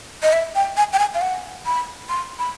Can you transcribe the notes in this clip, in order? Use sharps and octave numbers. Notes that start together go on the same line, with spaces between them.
D#5
E5
G5
G#5
G5
G#5
F5
F#5
B5
C6
B5